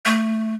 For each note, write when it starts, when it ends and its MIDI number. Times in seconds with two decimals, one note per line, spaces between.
0.06 0.54 57